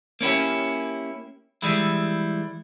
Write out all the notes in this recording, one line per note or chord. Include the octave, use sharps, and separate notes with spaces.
A#3 C#4 E4 G4
E3 G3 G#3 E4